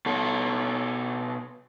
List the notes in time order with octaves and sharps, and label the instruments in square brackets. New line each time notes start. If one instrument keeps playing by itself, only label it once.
[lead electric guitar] B2 A4